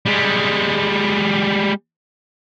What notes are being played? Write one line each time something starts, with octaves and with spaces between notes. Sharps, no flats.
G3 G#3